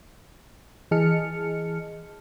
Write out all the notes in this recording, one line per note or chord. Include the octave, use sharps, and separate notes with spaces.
E3 G#4 D#5 A5 F6 C#7